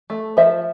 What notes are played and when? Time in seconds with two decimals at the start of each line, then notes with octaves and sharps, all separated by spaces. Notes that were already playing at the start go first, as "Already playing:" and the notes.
0.10 A3
0.37 F3 C5 E5